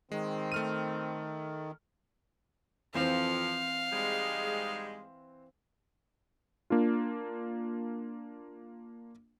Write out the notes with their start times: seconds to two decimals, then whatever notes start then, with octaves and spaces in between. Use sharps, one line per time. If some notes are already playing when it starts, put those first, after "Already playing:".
0.12 D#3 G#3 C4
0.52 A3 F6 D#7
2.94 F2 E3 F3 C4 C5 F5
3.93 G#2 G3 G#3
6.70 A#3 D4 F4